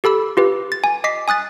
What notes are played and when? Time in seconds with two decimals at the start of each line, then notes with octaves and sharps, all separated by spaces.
0.04 G4 A4 B5 E6
0.37 F4 G4 B4
0.72 A6
0.84 G#5
1.04 D#5 D6 B6 C7
1.28 G#5 D#6 F#6 A6